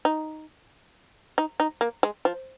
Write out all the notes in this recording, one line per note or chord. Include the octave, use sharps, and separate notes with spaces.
D#4
D#4
D#4
A#3
G#3
F3